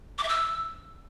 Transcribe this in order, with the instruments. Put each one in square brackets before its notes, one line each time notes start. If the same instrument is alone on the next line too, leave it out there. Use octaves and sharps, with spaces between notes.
[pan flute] D6
E5
E6